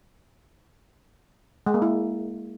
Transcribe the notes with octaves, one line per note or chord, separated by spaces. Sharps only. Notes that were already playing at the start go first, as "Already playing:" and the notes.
G#3
A#3
E4